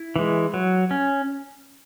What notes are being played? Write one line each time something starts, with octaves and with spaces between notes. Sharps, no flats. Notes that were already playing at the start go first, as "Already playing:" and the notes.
Already playing: E4
E3 G#3
F#3
C#4